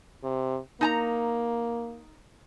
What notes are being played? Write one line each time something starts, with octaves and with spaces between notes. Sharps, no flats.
C3
A#3 D#4 A5 A#5